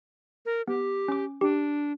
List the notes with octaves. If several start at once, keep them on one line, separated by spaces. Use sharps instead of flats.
A#4
B3 G4
C#4 D6
D4 G4